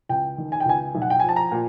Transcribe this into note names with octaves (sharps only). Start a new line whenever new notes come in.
C#2 G5
D#3
G#5
G5
C#2 G#5
B1
F#5
G5
G#5
F3
A5
A#5
A#2